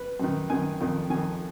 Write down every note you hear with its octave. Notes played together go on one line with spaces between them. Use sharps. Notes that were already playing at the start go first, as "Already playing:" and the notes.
Already playing: B4
F#2 D#3
F#2 D#3 G#5
F2 D#3
F2 D#3 G#5